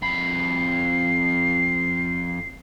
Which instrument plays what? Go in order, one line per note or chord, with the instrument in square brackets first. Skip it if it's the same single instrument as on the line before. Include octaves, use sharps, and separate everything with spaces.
[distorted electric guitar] F2 B5 [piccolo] C7